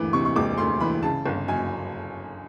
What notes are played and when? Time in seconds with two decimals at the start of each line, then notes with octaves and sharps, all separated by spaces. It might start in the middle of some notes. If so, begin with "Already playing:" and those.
Already playing: E1 D2 E3 D6
0.13 C3 C#6
0.25 C#6
0.36 E1 D6
0.58 D2 C6
0.80 E3 B5
1.03 C#3 A5
1.26 G1
1.48 F#2 G#5